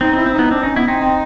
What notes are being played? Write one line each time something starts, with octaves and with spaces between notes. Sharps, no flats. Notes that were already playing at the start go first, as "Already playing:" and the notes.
C4 D#4
C4 E4
C4
B3 D#4
C4 D4
C#4 D#4
B3 E4
C4 D#4
C4